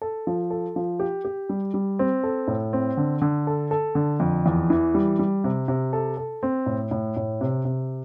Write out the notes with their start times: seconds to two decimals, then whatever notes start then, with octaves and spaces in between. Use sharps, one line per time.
0.01 A4
0.27 F3
0.51 A4
0.76 F3
1.00 G4
1.25 G4
1.49 G3
1.74 G3
1.99 C4
2.23 A4
2.48 A2
2.73 C4
2.97 D3
3.22 D3
3.47 A4
3.71 A4
3.95 D3
4.20 F2
4.46 E2
4.70 E3
4.95 G3
5.19 G3
5.44 C3
5.68 C3
5.93 A4
6.17 A4
6.43 C4
6.66 A2
6.91 A2
7.17 A2
7.41 C3
7.65 C3